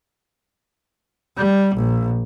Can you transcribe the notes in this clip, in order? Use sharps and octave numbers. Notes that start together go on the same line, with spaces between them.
G3
A#1